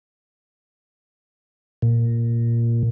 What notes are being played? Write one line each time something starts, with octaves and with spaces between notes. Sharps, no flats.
A#2